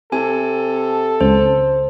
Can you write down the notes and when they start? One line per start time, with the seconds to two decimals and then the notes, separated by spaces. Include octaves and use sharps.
0.12 C3 A4 G#5
1.21 C#2 C5